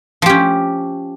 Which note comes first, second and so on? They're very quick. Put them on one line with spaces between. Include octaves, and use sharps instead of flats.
F3 G4 C#4